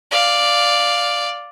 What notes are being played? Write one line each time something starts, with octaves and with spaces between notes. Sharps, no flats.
D5 F5